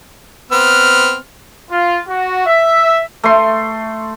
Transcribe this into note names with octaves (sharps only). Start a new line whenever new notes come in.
B3 C4 F6
F4
F#4
E5
A3 C6